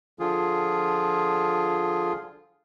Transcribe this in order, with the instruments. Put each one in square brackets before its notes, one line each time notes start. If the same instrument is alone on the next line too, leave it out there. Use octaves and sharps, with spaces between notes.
[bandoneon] D3 F3 F4 G#4